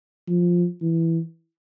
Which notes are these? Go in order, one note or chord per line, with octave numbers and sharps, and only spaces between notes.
F3
E3